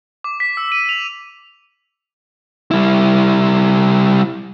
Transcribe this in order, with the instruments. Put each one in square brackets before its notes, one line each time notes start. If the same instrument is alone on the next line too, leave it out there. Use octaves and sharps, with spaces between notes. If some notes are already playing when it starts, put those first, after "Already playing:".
[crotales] D6
B6
E6
D#7
F7
[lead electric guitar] G3 E4